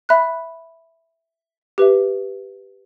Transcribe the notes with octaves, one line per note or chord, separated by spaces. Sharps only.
E5 B5 F#6
G4 B4 E5